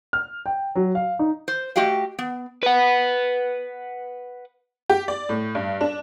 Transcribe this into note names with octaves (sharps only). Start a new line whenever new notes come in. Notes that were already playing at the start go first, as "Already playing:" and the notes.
F6
G5
F#3
F5
D#4
C5
A3 F#4 G4 D#5 F5
B3
B4 F#5
G4
D5
A2
G2
D4